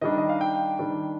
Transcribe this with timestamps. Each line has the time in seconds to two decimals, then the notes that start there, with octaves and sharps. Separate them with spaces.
0.01 D#3 G3 D4 D#5
0.18 D#5
0.29 F5
0.41 G5
0.79 D#3 G3 D4